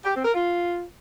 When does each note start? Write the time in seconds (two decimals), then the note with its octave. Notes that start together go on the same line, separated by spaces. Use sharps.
0.05 G4
0.15 C4
0.25 A#4
0.35 F4